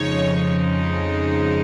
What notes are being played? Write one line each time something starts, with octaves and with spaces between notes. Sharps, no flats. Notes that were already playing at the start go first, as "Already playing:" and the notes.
Already playing: F2 C#3 F3 G#3 D#4 C#5